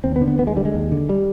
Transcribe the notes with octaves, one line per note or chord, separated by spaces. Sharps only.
D#2 C4
B3
D3
B3
D#2 B3
G#3
D3 G3
G#3
D#2
D3
G3